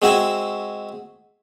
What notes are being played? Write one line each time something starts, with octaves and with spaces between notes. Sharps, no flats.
G#3 C4 F#4 E5 G#5